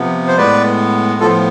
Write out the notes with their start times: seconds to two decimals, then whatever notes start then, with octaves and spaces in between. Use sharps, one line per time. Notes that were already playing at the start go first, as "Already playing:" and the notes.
Already playing: C3 F3 B3
0.28 C5
0.37 A2 G#3 B3 B4 D5
1.20 A2 F3 B3 F4 A4